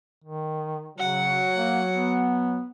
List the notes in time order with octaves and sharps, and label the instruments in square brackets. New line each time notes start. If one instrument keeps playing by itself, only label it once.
[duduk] D#3
[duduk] C#3 [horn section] F#3 [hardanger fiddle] F#5
[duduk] A#3
B3